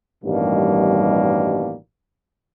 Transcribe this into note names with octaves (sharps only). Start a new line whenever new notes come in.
A1 G2 B2 D#3 G3 A#3